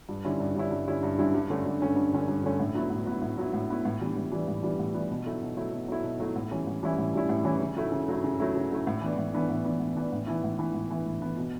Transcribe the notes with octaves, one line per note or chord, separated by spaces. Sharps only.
G2
D3 G3 C#4 E4
G2
D3 G3 C#4 E4
G2
D3 G3 C#4 E4
G2
D3 G3 C#4 E4
G2
D3 A3 C#4
G2
D3 A3 C#4
G2
D3 A3 C#4
G2
D3 A3 C#4
A2
F#3 B3 E4
A2
F#3 B3 E4
A2
F#3 B3 E4
A2
F#3 B3 E4
A2
E3 G3 B3 D4
A2
E3 G3 B3 D4
A2
E3 G3 B3 D4
A2
E3 G3 B3 D4
B2
F#3 A3 E4
B2
F#3 A3 E4
B2
F#3 A3 E4
B2
F#3 A3 E4
A2
E3 G3 C#4 E4
A2
E3 G3 C#4 E4
A2
E3 G3 C#4 E4
A2
E3 G3 C#4 E4
C#3
F#3 A3 E4
C#3
F#3 A3 E4
C#3
F#3 A3 E4
C#3
F#3 A3 E4
A2
E3 B3 D4
A2
E3 B3 D4
A2
E3 B3 D4
A2
E3 B3 D4
A2
E3 B3 E4
A2
E3 B3 E4
A2
E3 B3 E4
A2
E3 B3 E4
B2